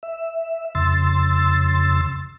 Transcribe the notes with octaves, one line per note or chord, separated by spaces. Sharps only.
E5
F2 C#3 C6 E6 A6